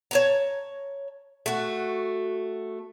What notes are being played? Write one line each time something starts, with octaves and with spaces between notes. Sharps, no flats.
C#5 A5 A#5
A3 F#4